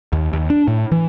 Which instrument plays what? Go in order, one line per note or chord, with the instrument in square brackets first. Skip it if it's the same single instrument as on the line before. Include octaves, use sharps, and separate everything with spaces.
[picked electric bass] D#2
D#2
D4
A2
E3